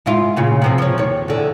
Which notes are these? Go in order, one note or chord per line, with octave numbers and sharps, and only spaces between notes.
G#2 E4 F4
A#2 C#3 F4
C3 F3 C4
F3 C#5
D#2 C#5
E2 D3